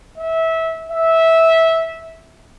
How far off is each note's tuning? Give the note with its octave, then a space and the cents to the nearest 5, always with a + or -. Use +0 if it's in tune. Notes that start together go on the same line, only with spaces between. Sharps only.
E5 -20
E5 -15